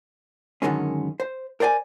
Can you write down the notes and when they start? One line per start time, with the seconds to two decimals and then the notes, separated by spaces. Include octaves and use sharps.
0.62 F#2 D3 D#3 G#3 C#4
1.20 C5
1.60 A#4 C5 D5 G5 G#5